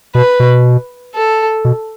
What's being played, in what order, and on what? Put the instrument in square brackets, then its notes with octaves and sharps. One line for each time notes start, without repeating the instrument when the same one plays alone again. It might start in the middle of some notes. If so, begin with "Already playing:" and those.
[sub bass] B2 [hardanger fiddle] B4
[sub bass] B2
[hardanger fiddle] A4
[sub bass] B2